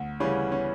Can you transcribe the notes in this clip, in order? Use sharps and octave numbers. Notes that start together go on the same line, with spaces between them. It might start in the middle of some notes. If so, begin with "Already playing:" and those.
Already playing: D2
C#3 E3 G3 C#4
C#4